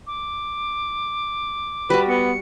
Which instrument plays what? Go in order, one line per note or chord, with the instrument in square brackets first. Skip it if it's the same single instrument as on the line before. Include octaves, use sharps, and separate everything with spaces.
[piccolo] D6
[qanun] G3 F#4 [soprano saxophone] B4
[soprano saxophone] B3 [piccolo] C#7